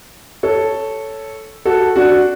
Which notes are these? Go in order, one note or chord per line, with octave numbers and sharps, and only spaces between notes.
A4 C#5
F#4 A4
D4 F#4